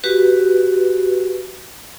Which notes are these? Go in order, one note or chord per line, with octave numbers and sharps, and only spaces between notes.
F#4 G4 B4